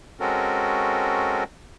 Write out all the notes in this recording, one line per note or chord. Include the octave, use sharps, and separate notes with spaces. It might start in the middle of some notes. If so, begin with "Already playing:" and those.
G#3 C4 C#4 F#4 A4 A#4